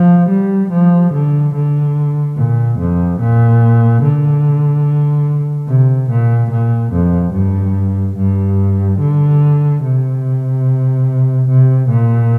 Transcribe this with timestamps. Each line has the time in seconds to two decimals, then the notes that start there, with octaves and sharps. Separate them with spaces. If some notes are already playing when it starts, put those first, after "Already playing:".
Already playing: F3
0.30 G3
0.71 F3
1.13 D3
1.55 D3
2.37 A#2
2.79 F2
3.20 A#2
4.02 D3
5.68 C3
6.10 A#2
6.51 A#2
6.93 F2
7.34 G2
8.17 G2
9.00 D3
9.83 C3
11.49 C3
11.89 A#2